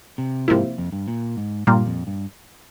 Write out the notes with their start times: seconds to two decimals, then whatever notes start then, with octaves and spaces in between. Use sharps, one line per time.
0.18 C3
0.48 G#2 C3 F3 A#3 E4
0.78 F2
0.92 G2
1.08 A#2
1.37 G#2
1.67 G2 A#2 G3 A#3 F4
1.87 F2
2.07 G2